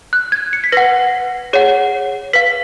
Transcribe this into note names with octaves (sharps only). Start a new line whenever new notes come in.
F#6
G#6
C#7
B6
B4 F#5 A#6
G#4 C#5 F#5
B4 F5 B6